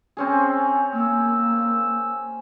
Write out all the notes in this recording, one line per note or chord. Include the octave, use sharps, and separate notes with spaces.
C4 C#4 G#4
A#3 E6